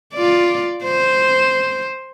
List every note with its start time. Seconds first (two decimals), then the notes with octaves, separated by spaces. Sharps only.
0.14 F4 D5
0.84 C5